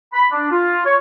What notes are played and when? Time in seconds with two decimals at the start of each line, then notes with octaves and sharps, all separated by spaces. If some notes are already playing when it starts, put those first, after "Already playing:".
0.13 B5
0.32 D4
0.51 F4
0.85 C#5